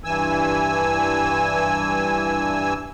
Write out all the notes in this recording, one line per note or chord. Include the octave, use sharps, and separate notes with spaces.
G2 E3 G#5 E6